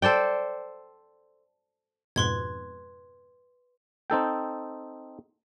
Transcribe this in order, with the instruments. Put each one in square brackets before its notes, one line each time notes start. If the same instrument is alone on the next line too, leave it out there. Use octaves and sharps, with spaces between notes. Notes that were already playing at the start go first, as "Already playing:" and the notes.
[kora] A4 C5 D5 G5
[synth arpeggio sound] F2 G#2 B2 [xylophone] B4 C6 G#6
[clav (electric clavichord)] C4 D#4 A4 G5